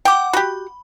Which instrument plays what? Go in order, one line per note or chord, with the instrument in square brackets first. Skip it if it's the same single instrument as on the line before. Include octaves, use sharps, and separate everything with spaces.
[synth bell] F#5 D6 [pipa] G5
[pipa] F#4 G4 [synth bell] B5